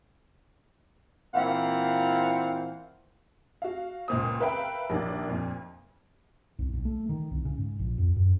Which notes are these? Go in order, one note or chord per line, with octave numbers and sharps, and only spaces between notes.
A#2 E3 C4 F5 F#5
F#4 F5
C#2 A#2 C5 D#6
A#4 B4 E5 F5 G5 B5
A#1 D#2 D4 D5
F2 A#2
C2
B1
A3
D#3
C2
C#3
G#2
A#1
F2
F#2